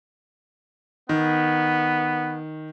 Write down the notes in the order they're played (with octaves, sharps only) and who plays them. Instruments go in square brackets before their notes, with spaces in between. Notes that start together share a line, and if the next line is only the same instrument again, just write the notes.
[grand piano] D#3 [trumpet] B3